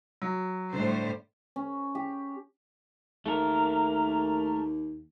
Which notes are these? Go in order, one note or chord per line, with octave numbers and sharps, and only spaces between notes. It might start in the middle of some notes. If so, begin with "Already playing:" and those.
F#3
A2 D3 G3 C5
C#4
G4
D#2 A3 A#4